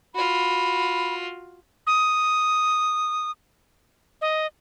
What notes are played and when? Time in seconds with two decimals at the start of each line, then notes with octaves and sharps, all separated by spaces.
0.15 F4 F#4 B5
1.87 D#6
4.21 D#5